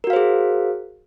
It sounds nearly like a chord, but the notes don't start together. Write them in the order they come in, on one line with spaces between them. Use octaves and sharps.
A#4 F#4 F5 C5 G#4